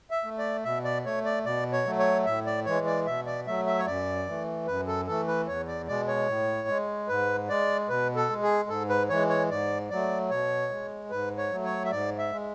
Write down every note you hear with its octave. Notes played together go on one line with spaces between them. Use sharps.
E5
A3
D5
B2 E5
D5
A3 C#5
D5
B2 D5
C#5
F#3 A3
C#5
A2 E5
D5
E3 G#3 C#5
D5
B2 E5
D5
F#3 A3 E5
E5
C#5
F#2 D5
E3 A3
F#2 B4
A4
E3 A3 A4
B4
E2 C#5
D5
B2 G#3 D5
C#5
A2
G#3
G#2 B4
G#3 D5
B2 B4
A4
G#3
G#4
G#2 A4
B4
E3 G#3 C#5
C#5
G#2 D5
F#3 A3 D5
B2 C#5
G#3
G#2 B4
C#5
F#3 A3
C#5
E5
G#2 D5
E5
G#3